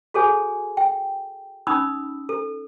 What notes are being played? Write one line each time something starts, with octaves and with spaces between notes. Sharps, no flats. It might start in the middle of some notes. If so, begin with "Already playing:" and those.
F#4 G#4 A4 C#5 G#5
G5
C#4 D#4 B5 D#6 E6
A4